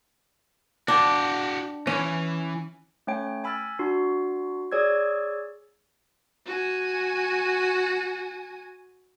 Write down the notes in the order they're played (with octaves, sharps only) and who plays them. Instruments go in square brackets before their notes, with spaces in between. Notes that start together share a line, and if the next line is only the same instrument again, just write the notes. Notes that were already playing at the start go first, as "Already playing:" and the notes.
[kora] D4 [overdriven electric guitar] F#4 G5
[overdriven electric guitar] E3 [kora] C#4
[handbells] A3 C#4 C#5 G5
G#5 B5 E6 F6 A6
D4 F#4 C6
G#4 C#5 D5 E6 G#6
[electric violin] F#4 G#5